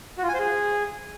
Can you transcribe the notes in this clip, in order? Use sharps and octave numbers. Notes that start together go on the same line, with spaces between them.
F#4
F4
G#5
C5
G#4